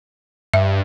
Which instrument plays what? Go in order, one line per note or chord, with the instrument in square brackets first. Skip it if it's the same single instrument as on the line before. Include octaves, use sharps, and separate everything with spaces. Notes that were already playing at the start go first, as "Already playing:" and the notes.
[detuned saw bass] G2 [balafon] E5